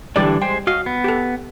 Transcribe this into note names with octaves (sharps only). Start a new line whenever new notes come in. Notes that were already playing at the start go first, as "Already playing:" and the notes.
D3 E3 G3 D4 G4 D5
G#3 C5 G5
F#4 D#5 F5
B3
G4 A4